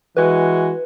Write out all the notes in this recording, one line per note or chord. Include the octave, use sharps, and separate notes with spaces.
E3 G#3 F#4 B4